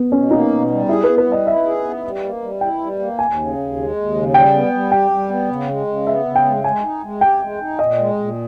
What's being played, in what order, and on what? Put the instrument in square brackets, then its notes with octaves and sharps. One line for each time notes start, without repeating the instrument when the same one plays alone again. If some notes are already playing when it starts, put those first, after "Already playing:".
Already playing: [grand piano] B3
[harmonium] B2 [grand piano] C#4
[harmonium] A#3 [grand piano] D#4
[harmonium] B2
G3
[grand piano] E4 [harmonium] G#4
[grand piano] B4
[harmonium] B3
[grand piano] B4
[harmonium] G3
[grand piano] D#5
[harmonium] E4 [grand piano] E5
[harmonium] G#4
B3
G3
A#3
G3
[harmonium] E4 [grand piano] G5
[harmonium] G3
A#3
[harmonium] D#2 [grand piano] G#5
[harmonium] C#3
D#2
G#3
D#2
C#3
[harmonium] G3 [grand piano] G5
[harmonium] B3
G3
[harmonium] G4 [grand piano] G5
[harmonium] G3
B3
C#3
G#3
C#3
[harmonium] B3 [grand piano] E5
[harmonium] C#3
[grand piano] G5
[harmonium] G#3
[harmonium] G#3 [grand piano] G#5
[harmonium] D#4
G#3
[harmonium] G4 [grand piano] G5
[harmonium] G#3
D#4
[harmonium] A#2 [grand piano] D#5
[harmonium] G#3
A#2